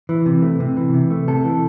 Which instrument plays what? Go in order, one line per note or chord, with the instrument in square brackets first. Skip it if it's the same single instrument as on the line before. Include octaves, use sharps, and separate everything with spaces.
[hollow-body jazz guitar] E3
C3
A3
C3
E3
C3
A3
C3 A4
E3